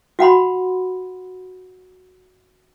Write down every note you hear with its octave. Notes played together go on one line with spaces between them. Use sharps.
F#4 F#5 B5 C6